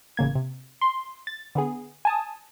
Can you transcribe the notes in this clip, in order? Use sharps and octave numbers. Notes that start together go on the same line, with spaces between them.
A1 C#3 A#3 G#6
C3
C6
A6
D3 B3 G#4
G#5 A5 D#6